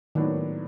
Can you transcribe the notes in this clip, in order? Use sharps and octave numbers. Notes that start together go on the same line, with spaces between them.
A2 D#3 F#3 B3 D4